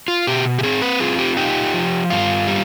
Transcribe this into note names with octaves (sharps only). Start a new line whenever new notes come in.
F4
B2 G4
G4
C4 G#4
B4
F4 G#4
G4
D#4 G4
F3
G2 F4
G3